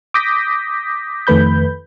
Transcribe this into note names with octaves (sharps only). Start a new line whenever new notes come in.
D6 D#6 G6 A#6 B6
F2 D#3 A3 B4 B5 G6